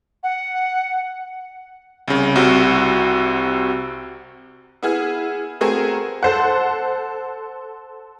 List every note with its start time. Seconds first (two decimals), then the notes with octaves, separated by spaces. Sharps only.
0.23 F#5
2.08 C2 C#3
2.36 C2 C3 F#4
4.83 B3 E4 G#4 F6
5.61 A3 B3 C4 F#4 G#4 A#4
6.23 A4 C5 F#5